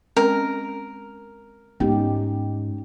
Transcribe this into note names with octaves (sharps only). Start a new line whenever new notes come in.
G#3 C4 C#4 A#4
G#2 B3 C#4 D#4 G4